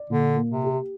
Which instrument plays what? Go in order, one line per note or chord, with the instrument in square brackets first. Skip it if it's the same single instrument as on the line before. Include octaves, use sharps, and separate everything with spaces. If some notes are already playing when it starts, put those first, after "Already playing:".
Already playing: [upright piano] D5
[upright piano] A#2 [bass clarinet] D3
[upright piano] A#3
[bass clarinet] C3
[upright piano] G4